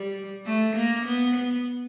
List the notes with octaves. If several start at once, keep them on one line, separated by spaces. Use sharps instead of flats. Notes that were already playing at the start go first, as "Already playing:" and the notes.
Already playing: G3
A3
A#3
B3
B3